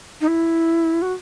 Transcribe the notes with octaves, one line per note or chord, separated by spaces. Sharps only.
D#4
E4
F#4